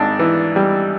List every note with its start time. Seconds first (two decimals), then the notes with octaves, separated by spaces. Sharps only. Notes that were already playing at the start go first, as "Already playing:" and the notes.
Already playing: G#1 G2 D4 D#4
0.19 E3
0.56 G3